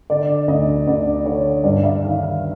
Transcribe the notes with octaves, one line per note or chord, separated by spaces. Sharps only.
D3 D5
D2 D#5
D2 D5
D3 C#5
G2 D5
E5
D#3 F5
F5